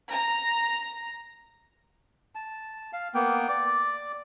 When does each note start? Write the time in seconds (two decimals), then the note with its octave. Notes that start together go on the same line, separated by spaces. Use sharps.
0.11 A#5
2.35 A5
2.93 F5
3.14 A#3 B3 G5
3.49 D5 D6